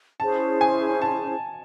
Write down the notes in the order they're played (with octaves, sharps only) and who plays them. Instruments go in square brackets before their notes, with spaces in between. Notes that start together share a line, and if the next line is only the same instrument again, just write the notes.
[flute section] C#4 E4 G#4 C5 [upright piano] A5
[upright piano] G#5
A5